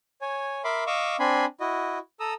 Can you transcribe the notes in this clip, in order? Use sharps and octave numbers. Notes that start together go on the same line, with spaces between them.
C#5 G#5
A#4 E5 B5 C6 D6
D#5 F5 C#6 D6 E6
C4 D4 G#5 B5 C6
E4 F#4 D#5
A4 A#5 D#6 E6